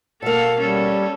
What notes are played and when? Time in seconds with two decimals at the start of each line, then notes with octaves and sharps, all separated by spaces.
0.22 B2 A#3 A4 F5
0.58 G3 C#4 A4